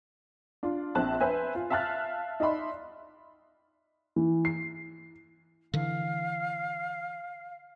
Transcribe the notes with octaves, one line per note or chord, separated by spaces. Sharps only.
D4 F4
A#1 C4 A5 F#6
B4 C5 E5 G#5
F4
E5 F5 A5 F6 F#6 A6
D#4 D5 E5 B5 C6
E3
C7
D3 E3 F5